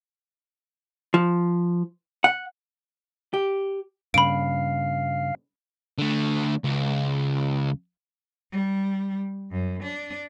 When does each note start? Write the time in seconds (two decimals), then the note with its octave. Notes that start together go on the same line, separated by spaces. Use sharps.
1.14 F3
2.24 F#5
3.34 G4
4.14 G2 C#3 F5 B5 D7
5.98 D3 A3
6.64 C#2
8.52 G3
9.52 F#2
9.83 D4